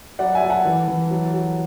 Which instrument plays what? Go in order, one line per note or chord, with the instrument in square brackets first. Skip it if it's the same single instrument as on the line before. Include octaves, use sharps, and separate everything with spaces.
[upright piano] F#3 D5 F#5
E5 G#5
F#3
F#5 A5
E3
E3
F#3
F#3